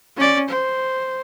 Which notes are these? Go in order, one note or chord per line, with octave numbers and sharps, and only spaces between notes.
C#4 D5
C5